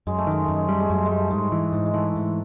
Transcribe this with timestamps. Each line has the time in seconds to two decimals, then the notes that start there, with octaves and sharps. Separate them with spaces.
0.07 F#2 G#3
0.18 A3
0.27 D#3 G#3
0.44 F#2 A3
0.56 G#3
0.68 G3 A3
0.81 G#3
0.90 F#2 A3
1.05 G#3
1.11 G3
1.18 A3
1.31 G#2 G#3
1.52 E3
1.73 G#2
1.86 G#3
1.93 E3 A3
2.15 G#2